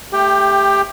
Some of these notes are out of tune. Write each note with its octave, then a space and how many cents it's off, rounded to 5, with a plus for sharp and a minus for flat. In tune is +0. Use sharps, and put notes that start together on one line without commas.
A3 +0 G4 +20 G5 +0